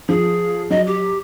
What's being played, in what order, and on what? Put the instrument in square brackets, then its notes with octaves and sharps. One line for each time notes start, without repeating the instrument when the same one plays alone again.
[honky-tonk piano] F3 [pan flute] G#4
[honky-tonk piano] F#3 [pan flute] D#5
[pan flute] G4